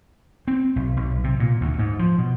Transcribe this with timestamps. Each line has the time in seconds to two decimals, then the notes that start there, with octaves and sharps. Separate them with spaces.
0.48 C4
0.76 B1
0.97 B1
1.24 C3
1.40 A#2
1.61 D2
1.79 G#2
1.99 F3
2.18 B2